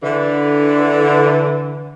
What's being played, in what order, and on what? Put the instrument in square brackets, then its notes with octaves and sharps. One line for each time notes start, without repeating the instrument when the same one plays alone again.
[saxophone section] D3 E3